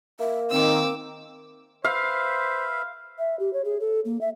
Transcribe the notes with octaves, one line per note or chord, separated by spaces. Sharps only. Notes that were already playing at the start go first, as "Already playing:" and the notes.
A#3 E5
D#3 C4 D6 E6
B4 C5 E5 F5
E5
G4
C#5
G#4
A4
A#3
E5